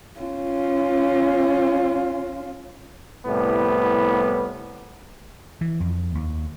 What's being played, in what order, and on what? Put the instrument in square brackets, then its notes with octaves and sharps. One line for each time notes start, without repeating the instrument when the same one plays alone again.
[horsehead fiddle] C#4 F4
[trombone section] C2 A2 G3 B3
[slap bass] E3
F2
D#2